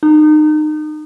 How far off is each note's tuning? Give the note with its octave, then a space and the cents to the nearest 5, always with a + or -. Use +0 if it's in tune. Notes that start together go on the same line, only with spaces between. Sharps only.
D#4 -30